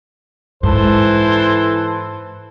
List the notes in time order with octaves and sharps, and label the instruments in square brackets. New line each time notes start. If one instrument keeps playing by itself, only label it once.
[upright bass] G#2 [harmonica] E3 A4 C5